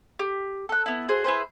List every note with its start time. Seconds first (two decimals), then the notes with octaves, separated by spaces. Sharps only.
0.19 G4
0.69 A4 F#6
0.86 B3 E4
1.08 F#4 G#4 C5
1.24 E4 G#4 B4 C5